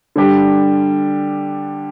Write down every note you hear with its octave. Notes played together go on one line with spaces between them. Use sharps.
D3 G3 D4 G4